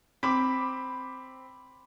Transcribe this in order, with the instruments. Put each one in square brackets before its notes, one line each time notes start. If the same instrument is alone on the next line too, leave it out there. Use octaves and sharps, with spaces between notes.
[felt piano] C4 D6 [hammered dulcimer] B5